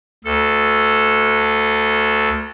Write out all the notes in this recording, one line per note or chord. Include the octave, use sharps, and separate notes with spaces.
D2 A4